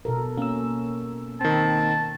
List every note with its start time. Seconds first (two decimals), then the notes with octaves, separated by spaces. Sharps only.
0.05 B2 A4 A#4
0.37 A#3 C#4 E6
1.41 D#3 C4 A5